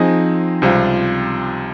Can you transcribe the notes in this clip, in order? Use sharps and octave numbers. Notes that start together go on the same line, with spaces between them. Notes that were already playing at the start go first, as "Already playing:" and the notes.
Already playing: F3 C4 D#4 G#4 D#5
C#2 C3 G3 C4 F4